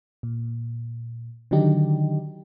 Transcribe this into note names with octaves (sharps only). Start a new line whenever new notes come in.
A#2
D3 D#3 F#3 D4 D#4 G4